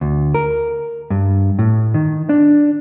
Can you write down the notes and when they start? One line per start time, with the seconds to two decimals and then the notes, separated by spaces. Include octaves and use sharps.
0.01 D2
0.34 A#4
1.10 G2
1.59 A2
1.94 D#3
2.29 D4